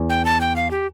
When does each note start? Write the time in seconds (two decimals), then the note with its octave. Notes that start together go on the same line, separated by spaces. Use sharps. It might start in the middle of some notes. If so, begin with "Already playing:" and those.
Already playing: E2
0.10 G5
0.25 A5
0.41 G5
0.56 F5
0.71 G4